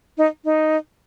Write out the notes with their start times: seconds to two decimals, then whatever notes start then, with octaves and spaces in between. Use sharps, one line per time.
0.18 D#4
0.45 D#4